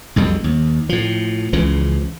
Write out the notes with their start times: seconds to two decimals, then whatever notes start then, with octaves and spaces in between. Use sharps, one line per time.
0.16 B1 F2 G3 G#3
0.44 D#2
0.89 A2 F3
1.53 C#2 C#3 E3 F3